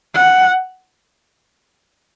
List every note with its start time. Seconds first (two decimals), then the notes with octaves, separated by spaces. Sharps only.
0.15 F#5